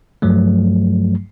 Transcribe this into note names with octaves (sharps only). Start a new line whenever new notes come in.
G2 F3 F#3 A3